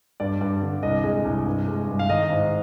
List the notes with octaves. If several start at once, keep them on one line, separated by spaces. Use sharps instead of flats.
G2 D5
G2
D3
C2 D#5
G#3
C2
G2
G#3
G2
F5
D#3 D#5
G#2